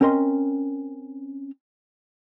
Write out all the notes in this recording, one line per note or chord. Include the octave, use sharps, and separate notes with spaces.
C4 C#4 A#4 D#5 C6